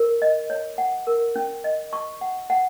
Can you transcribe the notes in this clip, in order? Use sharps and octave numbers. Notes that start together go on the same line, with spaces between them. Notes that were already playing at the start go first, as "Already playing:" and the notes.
Already playing: A#4
D#5
C#5
F#5
A#4
C#4
D#5
C#6
F#5
F#5